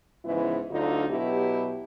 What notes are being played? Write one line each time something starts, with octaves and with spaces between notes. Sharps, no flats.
G#2 C#3 E3 F3 B3 E4
D2 D3 F#3 D4 D#4 F4
B2 F#3 B3 E4 G4